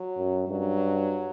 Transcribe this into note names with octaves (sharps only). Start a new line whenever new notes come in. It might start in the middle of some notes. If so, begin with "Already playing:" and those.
Already playing: F#3
F#2
G2 F#3